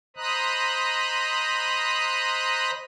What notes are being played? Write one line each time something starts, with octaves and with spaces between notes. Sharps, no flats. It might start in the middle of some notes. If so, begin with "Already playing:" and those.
C5 D#5 A#5 B5 D#6 F#6